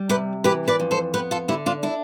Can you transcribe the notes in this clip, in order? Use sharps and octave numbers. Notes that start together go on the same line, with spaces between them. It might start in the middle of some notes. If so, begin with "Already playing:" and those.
Already playing: G3
C3 G4 B4
E3 G4 B4
B4 D5
F2
A4 C5
B3 G4 B4
F4 A4
D3 E4 G4
D4 F4
D4 E4